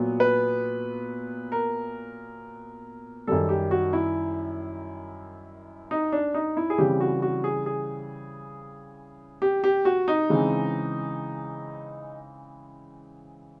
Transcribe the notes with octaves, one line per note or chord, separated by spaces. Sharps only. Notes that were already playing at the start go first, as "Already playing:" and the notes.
Already playing: A#2 F#3 B3
B4
A#4
F#2 D#3 G3 A4
G4
F#4
E4
D#4
D4
D#4
E4
G#4
C#3 E3 G3 C4 G4
F#4
F#4
G#4
G#4
G4
G4
F#4
D#4
C#3 E3 G#3 C4